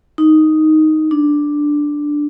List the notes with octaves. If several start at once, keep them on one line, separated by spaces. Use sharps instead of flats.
D#4
D4